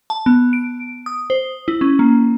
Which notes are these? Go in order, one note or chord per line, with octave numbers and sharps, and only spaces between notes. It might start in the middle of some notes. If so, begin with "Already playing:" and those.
A5
B3
D7
D#6
C5
E4
C#4
A#3